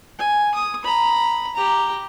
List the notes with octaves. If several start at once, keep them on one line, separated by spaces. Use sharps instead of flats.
G#5
D#6
A#5 B5
G4 A#5